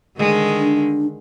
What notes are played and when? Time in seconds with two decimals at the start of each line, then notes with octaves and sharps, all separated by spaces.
0.17 D3 D#3 G#3
0.57 D4